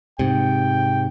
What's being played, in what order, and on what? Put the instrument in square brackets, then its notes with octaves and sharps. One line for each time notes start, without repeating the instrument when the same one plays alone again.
[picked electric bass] G#2 C3 [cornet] G5